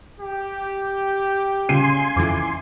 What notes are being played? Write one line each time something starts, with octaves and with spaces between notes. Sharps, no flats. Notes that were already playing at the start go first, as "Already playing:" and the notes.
G4
C#3 G#5 C6 D#7
F2 E3 D6